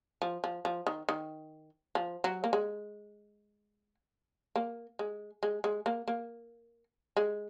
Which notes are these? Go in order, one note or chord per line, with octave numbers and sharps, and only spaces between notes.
F3
F3
F3
D#3
D#3
F3
F#3
A#3
G#3
A#3
G#3
G#3
G#3
A#3
A#3
G#3